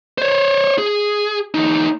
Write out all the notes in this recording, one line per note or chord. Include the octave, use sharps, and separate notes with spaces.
C5 C#5
G#4
E2 D#4